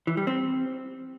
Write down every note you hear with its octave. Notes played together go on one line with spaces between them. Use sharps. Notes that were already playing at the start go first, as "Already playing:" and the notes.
E3
G3
C4